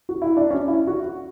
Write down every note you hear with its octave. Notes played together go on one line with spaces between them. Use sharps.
F#4
E4
D4
C#4
E4
F#4